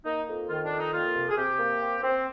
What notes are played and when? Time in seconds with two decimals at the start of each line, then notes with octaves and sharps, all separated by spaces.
0.05 A#3 D#4
0.27 F2
0.49 D#3 F4
0.64 D4
0.71 F2
0.78 D#4
0.93 A#3 F4
1.15 C3
1.29 G#4
1.37 C3 G4
1.59 A#3
1.81 C4
2.03 C4